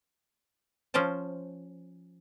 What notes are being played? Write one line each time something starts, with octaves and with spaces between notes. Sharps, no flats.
F3 C#4 C5 G5 A5